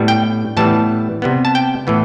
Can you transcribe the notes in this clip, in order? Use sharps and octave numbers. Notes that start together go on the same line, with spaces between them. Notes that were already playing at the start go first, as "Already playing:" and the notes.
Already playing: A2 G3 B3
G5
A2 E3 G3 B3 A5
C3 G3 B3
A5
G5
A2 E3 B3